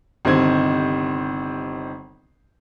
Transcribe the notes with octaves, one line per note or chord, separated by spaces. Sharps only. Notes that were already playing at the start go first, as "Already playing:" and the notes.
G1 C3 D#3 D#4 C5 G#6